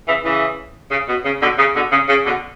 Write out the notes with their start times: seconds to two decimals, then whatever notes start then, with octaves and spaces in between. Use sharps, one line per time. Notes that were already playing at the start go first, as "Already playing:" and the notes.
0.08 C#3 E3
0.25 C#3 E3
0.92 C#3
1.09 B2
1.25 C#3
1.42 B2 D3
1.59 C#3
1.76 B2 D3
1.92 C#3
2.09 C#3
2.25 B2 D3